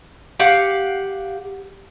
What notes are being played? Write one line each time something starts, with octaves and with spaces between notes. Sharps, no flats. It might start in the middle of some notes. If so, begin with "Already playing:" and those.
G4 F5 F#5